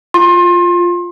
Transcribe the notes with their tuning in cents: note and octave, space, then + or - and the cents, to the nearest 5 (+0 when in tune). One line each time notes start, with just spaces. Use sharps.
F4 +0 C6 +30